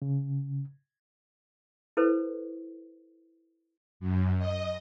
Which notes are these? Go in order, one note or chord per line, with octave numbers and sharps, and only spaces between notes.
C#3
E4 A4 B4 C5
F#2
D#5